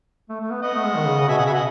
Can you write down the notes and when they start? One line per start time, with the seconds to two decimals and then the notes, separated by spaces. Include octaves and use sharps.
0.29 A3
0.41 A3
0.51 B3
0.62 B3 D#5 F#5
0.74 A3
0.85 G#3
0.96 D#3
1.06 C#3
1.18 C#3
1.28 B2 E5 G#5
1.38 C#3 D#5 F#5
1.45 E5 G#5
1.51 B2
1.54 D#5 F#5